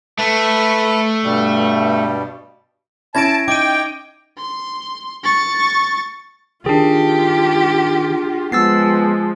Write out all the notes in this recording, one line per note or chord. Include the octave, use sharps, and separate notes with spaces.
A3 B4 A5 B5
G2 B2 G3
C#4 E4 A5 G#6 A#6 D7
D#4 G5 D6 D#7
C6
C#6 A6
D#3 D4 F4 G4 G#4
F3 G#3 B3 E6 A6 C7